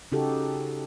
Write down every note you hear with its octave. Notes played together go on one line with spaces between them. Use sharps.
C#3 D#4 F#4 G4 A4